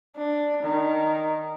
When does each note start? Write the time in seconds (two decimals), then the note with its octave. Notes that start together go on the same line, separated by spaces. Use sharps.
0.16 D4
0.63 D#3